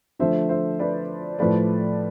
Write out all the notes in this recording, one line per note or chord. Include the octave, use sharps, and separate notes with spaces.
D3 F3 A3 C5 E5
C5 E5
B4 D5
A2 F3 A3 B4 D5